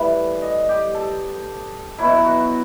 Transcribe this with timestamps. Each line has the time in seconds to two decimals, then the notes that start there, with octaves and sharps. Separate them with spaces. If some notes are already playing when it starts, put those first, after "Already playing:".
Already playing: A2 E3 G3 B4 E5
0.42 D#5
0.69 G4
0.95 A4
1.98 B2 F#3 E4
2.25 F#4